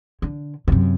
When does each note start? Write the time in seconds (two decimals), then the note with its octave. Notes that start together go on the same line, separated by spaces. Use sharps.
0.22 D3
0.68 F#2 C3